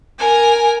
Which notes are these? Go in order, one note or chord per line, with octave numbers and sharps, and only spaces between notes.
A#4 G#5